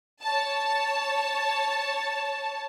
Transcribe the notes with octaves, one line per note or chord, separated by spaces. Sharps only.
C#5 A5